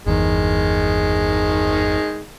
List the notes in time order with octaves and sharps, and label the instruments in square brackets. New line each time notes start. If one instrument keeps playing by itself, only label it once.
[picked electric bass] G1 E2 [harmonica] D#3 G#3